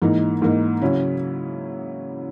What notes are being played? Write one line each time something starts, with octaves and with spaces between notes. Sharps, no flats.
G#2 E3 A#3 D#4
G#2 E3 A#3 D#4
C#3 F#3 C#4 E4